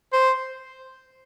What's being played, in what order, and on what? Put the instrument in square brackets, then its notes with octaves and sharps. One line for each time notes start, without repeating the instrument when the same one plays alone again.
[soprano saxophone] C5